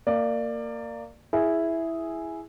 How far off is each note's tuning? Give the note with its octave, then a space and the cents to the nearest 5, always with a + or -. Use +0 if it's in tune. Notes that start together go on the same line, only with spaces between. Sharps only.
A#3 -20 D5 +15
E4 +0 G#4 +0